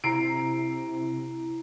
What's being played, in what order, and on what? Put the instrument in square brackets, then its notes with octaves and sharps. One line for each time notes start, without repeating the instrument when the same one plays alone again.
[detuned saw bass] C3 [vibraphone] E4 [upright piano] A#5 C7 D7